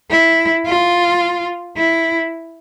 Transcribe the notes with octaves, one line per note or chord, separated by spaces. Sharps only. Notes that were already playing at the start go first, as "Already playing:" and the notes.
E4
F4
E4